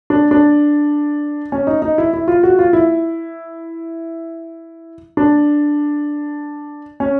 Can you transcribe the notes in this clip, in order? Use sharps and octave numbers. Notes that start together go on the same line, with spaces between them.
D4
D4
C#4
D#4
D#4
E4
E4
F4
F#4
F4
E4
D4
C#4